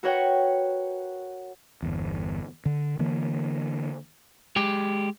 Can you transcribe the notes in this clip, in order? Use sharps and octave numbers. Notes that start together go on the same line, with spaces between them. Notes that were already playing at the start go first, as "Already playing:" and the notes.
F#4 A#4 B4 C#5 F#5 G5
G1 E2
D3
D3 E3 A#3
G#3 G4